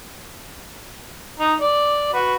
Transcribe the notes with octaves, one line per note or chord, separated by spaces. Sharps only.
D#4 A#5
D5
F#4 B4